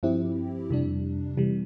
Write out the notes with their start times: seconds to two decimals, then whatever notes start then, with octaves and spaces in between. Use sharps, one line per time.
0.03 G2 F3 C4 E4 G4
0.70 F2 C3 G3 D4
1.37 C3 E3 G3